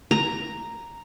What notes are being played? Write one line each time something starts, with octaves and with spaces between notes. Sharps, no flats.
A#5